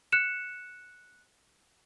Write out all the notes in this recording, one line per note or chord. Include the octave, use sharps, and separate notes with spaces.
F#6 C#7 E7